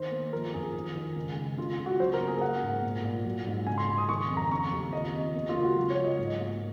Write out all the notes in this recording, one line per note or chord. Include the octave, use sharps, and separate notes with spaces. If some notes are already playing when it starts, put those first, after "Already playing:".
Already playing: D#3 C5
A#3
F3 A#4
F#2 G#4
D#3
D#3
C#2
C#2
C#3 F4
C#3
F#4
F#3 C5
A#4
A#3
G#4
A#3 F#5
G#2
A#2
A#2
F#3
G#2
C#3 G#5
C6
C#2
D#6
D#3 C#6
F2
A#5
C#3 C#6
D#2
F3 D#5
C3
A#3
F4
C#2
F#4
F#3 F#4
C#5
F#3
D#5
G#2
A#3